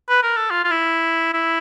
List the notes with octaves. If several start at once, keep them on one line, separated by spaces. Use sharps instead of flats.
B4
A#4
A4
F4
F4
E4
E4